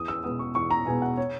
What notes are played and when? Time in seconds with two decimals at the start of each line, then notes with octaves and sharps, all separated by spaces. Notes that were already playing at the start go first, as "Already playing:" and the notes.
Already playing: E2 D#6
0.08 E6
0.24 B2 G#3 B3 D#6
0.39 C#6
0.55 E2 C#6
0.71 A#5
0.86 B2 G#3 B3 G#5
1.02 F#5
1.17 C#5